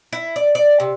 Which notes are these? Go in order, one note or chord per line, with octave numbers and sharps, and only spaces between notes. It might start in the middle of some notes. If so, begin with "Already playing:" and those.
E4
D5
D5
C3